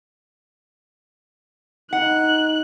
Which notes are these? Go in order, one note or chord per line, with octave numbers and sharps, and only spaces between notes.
D#4 F#5 F#6